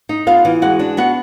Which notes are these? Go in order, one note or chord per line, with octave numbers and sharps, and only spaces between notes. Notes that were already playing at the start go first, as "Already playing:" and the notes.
D#4
B3 F4 F5
E3
G#3 F#4 F#5
D4
B3 F#4 F#5